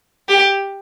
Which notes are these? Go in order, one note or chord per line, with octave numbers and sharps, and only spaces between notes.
G4